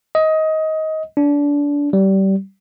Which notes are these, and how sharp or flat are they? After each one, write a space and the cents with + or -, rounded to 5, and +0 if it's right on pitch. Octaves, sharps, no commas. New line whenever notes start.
D#5 +20
D4 -25
G3 -25